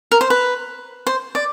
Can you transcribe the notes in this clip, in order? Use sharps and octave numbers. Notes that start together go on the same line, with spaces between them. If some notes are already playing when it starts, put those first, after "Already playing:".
A#4
C5
B4
C5
D5